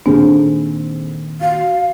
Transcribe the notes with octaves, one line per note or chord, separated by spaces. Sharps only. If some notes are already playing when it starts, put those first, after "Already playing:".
A#2 D#3 A#3 C4 D4 G#4 A4
F#4 F5